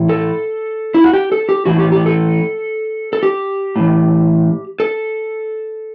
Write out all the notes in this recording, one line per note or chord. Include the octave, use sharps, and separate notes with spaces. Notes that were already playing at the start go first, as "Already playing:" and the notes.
Already playing: A2 E3
A4
E4
F#4
G4
A4
G4
A2 E3 F#4
G4
G4
A4
A4
G4
A2 E3
A4